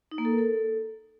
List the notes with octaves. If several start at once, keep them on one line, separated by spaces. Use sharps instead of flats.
D#4
A#3
A4
A#4
A4